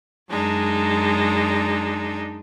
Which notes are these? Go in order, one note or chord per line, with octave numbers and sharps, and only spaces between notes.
F#2 G#3 D4 D#4